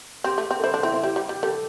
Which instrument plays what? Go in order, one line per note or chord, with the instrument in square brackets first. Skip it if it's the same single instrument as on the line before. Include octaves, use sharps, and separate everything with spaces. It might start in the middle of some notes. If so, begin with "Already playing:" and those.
[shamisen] C4 [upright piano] G4
[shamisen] A3
C4
[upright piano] A4
[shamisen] E4 [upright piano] C5
[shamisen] D4
[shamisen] C4 [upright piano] E4
[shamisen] C4 [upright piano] E4
[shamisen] G3 [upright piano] G4
[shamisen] G3
G3
[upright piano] G4
[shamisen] G3 [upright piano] A4